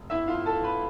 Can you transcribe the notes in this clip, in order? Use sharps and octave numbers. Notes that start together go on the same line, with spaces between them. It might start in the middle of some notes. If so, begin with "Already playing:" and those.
Already playing: F1
G1 E4 E5
F4 F5
G1
A4 A5
E3
B4 B5